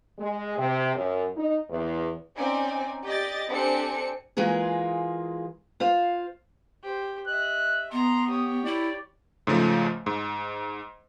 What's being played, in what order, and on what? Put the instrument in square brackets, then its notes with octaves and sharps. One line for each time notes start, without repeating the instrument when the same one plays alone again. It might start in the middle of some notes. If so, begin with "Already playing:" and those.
[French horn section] G#3
C3
F#2
D#4
E2
[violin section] C4 C#4 D#4 D5 G#5
G4 D5 D#5 A6
C4 D4 G4 A4 G#5 C#7
[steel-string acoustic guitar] E3 G#3 A#3 F4 G#4
F4 C5 F5
[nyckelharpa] G4 C5
[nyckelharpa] D#5 E5 [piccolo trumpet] F#6
[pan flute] B3 [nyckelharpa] A#5 [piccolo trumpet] C6
[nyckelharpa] G4 C#5 [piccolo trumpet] D#6
[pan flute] E4 [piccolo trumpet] D5
[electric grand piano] G#2 C#3 F3 A3
G#2